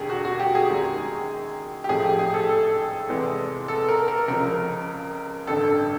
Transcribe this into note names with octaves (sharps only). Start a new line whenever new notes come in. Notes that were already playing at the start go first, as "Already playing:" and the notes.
Already playing: E1 D#2 D3 G4 G#4
F#4
F#4
G4
G#4
F#2 D#3 G#3
G4
A1 G#2 F3 A3 G#4
G4
G#4
A4
A4
E2 C3 E3 G#3
A4
A#4
A#4
C#2 C#3 F3 A#4
A1 G2 D3 A4